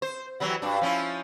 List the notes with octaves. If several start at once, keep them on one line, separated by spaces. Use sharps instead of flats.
C5
E3 F#3 G3
G2 D4
F3 C#4 E4